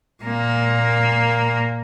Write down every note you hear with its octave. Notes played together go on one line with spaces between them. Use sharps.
A#2 A#3